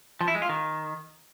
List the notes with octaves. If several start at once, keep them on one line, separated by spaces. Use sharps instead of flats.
F3
E4
G#3
F4
D#3